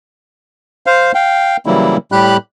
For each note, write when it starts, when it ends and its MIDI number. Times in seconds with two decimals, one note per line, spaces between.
0.86 1.12 72
0.86 1.12 77
1.15 1.57 77
1.15 1.57 79
1.66 1.97 49
1.66 1.97 52
1.66 1.97 54
1.66 1.97 55
1.66 1.97 58
1.66 1.97 64
2.12 2.37 45
2.12 2.37 55
2.12 2.37 67
2.12 2.37 83
2.12 2.37 90